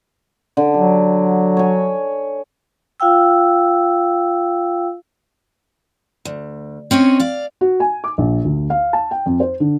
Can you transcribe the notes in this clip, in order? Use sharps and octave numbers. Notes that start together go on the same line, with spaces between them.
D3 D4
F#3 G4
C#5 G#5
F4 F5 G5 E6
D2
C4 C#4 C#5 D#5
D5 F5
F#4
G#5
D6
A#1
D2
F5
A5
G5
F2
C5
D3